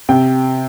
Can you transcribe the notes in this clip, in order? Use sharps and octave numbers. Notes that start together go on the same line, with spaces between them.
C3 G5